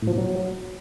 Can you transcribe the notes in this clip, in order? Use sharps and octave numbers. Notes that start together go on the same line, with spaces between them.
A2
F3
A#2
F#3